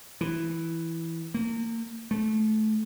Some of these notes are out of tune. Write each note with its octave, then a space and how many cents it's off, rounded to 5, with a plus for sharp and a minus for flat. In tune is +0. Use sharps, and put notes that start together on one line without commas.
E3 +0
A#3 -30
A3 -20